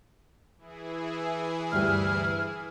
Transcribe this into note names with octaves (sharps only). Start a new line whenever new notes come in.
E3 E4 G#4
D2 G2 G4 F6